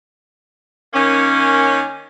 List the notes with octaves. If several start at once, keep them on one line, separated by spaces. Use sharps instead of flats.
D#3 A#3 C#4